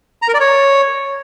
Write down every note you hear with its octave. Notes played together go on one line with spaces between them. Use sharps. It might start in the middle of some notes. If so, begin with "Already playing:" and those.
A#5
A#4
D5
C#5